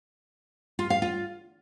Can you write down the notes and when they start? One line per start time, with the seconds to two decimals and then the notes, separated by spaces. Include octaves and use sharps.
0.79 F4
0.90 F5
1.02 F4